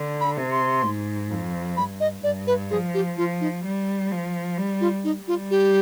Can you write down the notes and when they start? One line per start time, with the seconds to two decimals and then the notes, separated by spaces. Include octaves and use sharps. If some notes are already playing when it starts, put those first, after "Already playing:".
Already playing: D3
0.21 B5
0.37 C3
0.52 C6
0.84 G#2
1.30 F2
1.77 G2 B5
2.00 D#5
2.24 G2 D5
2.47 B4
2.71 F3 G#4
2.94 G4
3.18 F3 F4
3.41 D#4
3.64 G3
4.11 F3
4.58 G3
4.81 F4
5.04 D#4
5.21 G3
5.28 F4
5.51 G4